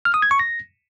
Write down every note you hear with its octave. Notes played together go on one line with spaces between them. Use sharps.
F6
D#6
G#6
C#6
A#6